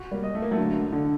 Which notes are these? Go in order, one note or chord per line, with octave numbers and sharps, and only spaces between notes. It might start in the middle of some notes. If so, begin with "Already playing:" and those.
Already playing: F#4
G3 A#3
D#5
A3
A#3
F#3 A3
D3
D3